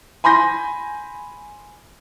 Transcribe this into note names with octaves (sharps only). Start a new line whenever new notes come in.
G#5 B5 C6 G6 A#6